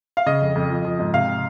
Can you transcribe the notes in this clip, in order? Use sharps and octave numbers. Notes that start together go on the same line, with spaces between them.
F5
C#3 D#5
F2
F2
F3
F3
G#2
C3 F5